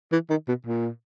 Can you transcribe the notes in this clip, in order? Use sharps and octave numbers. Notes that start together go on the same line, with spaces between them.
E3
D#3
B2
A#2